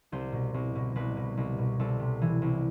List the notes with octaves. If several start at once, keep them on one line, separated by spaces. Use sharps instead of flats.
C2 C5
B2
C2
B2
C2 B4
B2
C2
B2
C2 A4
C3
E3
C2